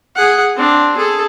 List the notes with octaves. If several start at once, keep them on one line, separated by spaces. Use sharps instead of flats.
G#4 F#5
C4 D4
G#4 A4